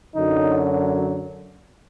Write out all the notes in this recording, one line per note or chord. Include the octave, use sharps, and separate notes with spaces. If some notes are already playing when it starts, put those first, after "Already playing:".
F#2 D3 F#3 D#4